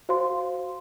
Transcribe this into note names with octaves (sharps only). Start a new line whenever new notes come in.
F#4 C5 F5 C6